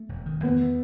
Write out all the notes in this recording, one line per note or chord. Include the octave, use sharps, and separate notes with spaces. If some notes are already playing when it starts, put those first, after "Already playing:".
Already playing: A3
E1
D#3
E2 B3
A3